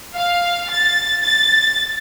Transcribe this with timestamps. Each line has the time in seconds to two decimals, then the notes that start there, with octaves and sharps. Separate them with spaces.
0.15 F5
0.69 A6
1.23 A6